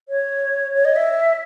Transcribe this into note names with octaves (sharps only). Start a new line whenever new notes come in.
C#5
C#5
D#5
E5